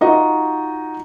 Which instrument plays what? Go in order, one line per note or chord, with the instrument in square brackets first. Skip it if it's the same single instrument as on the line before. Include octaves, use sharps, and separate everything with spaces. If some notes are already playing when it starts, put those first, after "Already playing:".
[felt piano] D#4 F4 F#4 D#5